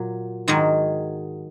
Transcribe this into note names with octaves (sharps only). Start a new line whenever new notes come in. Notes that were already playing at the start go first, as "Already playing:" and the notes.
Already playing: A#2 F#3
G#2 D#3 F#3